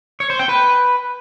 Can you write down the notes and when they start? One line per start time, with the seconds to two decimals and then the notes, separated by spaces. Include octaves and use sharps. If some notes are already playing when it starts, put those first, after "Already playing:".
0.20 C#5
0.30 C5
0.39 G5
0.49 B4